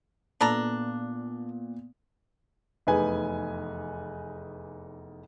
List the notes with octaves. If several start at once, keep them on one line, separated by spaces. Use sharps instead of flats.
A#2 B3 D4 A4 A#5
F1 E2 D#4 B4 G#5